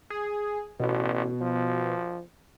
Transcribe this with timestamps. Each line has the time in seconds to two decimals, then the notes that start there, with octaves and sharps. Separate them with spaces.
0.10 G#4
0.80 A1 B2
1.41 F3